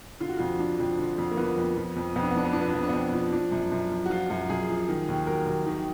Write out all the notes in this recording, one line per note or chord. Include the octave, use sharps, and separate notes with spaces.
D3 F4
F#4
F2 F4
F3 D4
F2
D3
F2
A#3
F3 B3
F2
F3
F2
F2 B3
D4
B3
F3 D4
B3
F3 D4
B3
D4
F2 B3
D4
F2 B3
F3
F3 D4
F#2
F#2
F3
F#4
F3 F4
F#2 F#4
F#2 G#4
F3
D#3
D#2
F#3 A#4
D#2
D#3